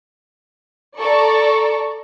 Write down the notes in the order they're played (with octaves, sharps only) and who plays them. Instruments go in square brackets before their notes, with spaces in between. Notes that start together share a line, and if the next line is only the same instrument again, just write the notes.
[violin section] A4 D5 A#5 C#6